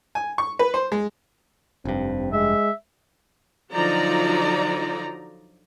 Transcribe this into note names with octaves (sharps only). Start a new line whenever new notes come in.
G#5
C#6
B4
C5
G#3
F1 G2 C4
G#3 E5
D3 F3 F#3 D#4 D5 A#5